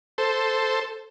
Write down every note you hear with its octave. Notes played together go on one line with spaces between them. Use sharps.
A4 C5